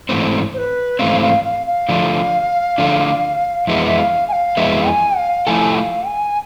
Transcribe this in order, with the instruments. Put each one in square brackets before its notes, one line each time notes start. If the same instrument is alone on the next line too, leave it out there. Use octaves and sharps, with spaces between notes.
[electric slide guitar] G#2 E3 A3 C4
[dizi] C5
B4
[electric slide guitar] G#2 E3 A3 C4 [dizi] F5
[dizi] F5
F5
F5
[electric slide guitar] D3 F3 A3 D4
D3 F3 A3 D4
[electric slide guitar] F2 E3 G#3 B3 [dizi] E5
[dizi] E5
F5
G#5
F5
[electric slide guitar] F2 E3 G#3 B3 [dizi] E5
[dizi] G#5
F5
[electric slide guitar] F3 A3 E4 A4 [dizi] G#5
[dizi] F5
G#5